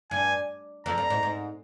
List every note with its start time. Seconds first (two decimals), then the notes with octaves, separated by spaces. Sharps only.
0.11 G2 G#5
0.86 F2 A#5
0.98 G2
1.10 G#2
1.23 G#2